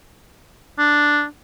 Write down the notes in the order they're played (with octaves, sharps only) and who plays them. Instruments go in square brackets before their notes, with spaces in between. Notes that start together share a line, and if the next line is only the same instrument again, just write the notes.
[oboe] D4